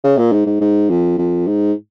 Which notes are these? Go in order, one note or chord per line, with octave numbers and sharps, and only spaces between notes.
C#3
A#2
G#2
G#2
G#2
F2
F2
G#2